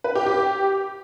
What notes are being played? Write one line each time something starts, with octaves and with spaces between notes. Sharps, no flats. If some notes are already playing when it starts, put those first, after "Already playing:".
B4
G4
G4